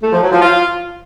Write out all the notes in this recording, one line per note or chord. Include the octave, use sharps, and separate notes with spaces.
A3
F3
F#3
F3
F4